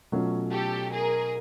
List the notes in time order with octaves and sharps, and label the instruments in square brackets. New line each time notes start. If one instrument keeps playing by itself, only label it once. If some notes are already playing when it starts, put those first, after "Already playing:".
[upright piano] B2 F#3 A3 C#4 F4
[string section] G4 A4
G#4 A#4